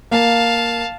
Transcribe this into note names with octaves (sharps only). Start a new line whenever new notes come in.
A#3 F5 A5